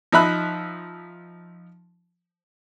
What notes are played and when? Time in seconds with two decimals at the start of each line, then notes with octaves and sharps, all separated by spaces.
0.12 F3 D#4 E5 B5 F#6